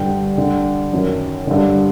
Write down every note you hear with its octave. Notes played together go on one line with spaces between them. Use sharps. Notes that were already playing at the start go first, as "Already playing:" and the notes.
Already playing: G2 D3 G5
G2 D3
F#2 D#3
G2 D3